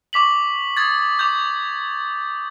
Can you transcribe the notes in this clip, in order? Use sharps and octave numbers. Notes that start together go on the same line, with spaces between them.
C#6 D6 B6 F#7
D#6 G#6 A6
D6 G6